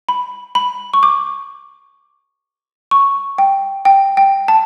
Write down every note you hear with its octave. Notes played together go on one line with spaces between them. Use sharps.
B5
B5
C#6
D6
C#6
G5
G5
G5
A5